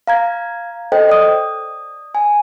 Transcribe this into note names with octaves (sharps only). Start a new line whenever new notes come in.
F5 A#5 G#6
A4 C5 D#5 G5
D5 D#6
G#5